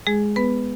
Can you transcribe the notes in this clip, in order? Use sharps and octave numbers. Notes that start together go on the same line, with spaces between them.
G#3 G#4
B3 B4